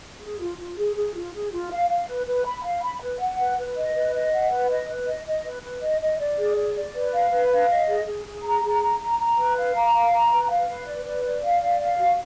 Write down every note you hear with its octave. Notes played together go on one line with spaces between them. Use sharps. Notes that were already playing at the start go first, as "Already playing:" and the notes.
G#4
F4
F4
G#4
G#4
F4
G#4
F4
F5
F5
B4
B4
B5
F5
B5
B4
F#5
B4
B4
D#5
B4
D#5
F#5
B4
D#5
B4
D#5
D#5
B4
B4
D#5
D#5
D5
G#4
D5
D5
B4
F5
B4
F5
D#5
G#4
G#4
G#4
A#5
G#4
A#5
A#5
A#5
B4
F5
A#5
F5
A#5
B4
F5
B4
D5
B4
D5
F5
D5
F5
F#4